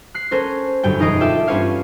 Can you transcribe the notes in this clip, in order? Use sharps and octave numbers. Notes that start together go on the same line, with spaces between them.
F#6 C7
C#4 A4 A#4 C5
G1 F#2 G3 G5
E1 D#4 G#4 D#5 C7 D7
F4 A4 D5 E5 G5
G2 C#4 F4 B4 C#5 F5